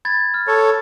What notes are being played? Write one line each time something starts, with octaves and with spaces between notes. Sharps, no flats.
B5 G#6 A6
F6
A4 C#5